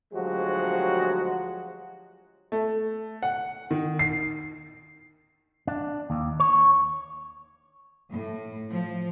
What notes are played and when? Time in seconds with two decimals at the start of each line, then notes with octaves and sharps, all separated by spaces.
0.14 D2 F3 F#3 G#3 F#4 G4
2.52 A3
3.23 F#5
3.71 D#3
3.99 C7
5.67 D4
6.10 D#2
6.40 C#5
8.11 A2
8.70 F3